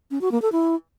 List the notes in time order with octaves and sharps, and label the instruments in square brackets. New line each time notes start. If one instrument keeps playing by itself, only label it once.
[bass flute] C#4
F#4
A#3
A4
E4